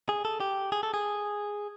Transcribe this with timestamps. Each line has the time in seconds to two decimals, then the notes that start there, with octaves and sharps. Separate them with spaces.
0.09 G#4
0.25 A4
0.40 G4
0.72 G#4
0.83 A4
0.94 G#4